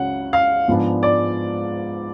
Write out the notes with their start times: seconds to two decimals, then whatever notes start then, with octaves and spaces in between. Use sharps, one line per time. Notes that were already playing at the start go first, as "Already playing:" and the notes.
Already playing: C#2 C#3 F#3 C#4 F#5
0.33 F5
0.68 G#2 F3 G#3 B3 D4
1.03 D5